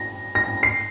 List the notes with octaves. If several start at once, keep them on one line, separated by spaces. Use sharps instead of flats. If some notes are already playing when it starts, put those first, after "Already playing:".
Already playing: A#6
A#6
C7